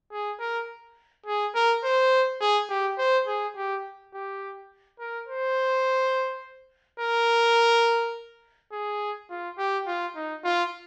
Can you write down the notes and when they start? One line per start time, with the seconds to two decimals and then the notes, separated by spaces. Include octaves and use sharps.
0.12 G#4
0.40 A#4
1.26 G#4
1.55 A#4
1.84 C5
2.41 G#4
2.70 G4
2.99 C5
3.27 G#4
3.56 G4
4.13 G4
4.99 A#4
5.28 C5
7.00 A#4
8.72 G#4
9.30 F4
9.58 G4
9.87 F4
10.16 D#4
10.44 F4